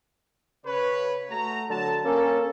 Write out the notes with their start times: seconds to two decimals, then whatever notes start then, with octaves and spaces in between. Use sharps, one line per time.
0.66 C#3 B4 C#5
1.30 A3 F#4 A#5
1.70 D3 F#3 A5
2.05 A#3 C#4 A4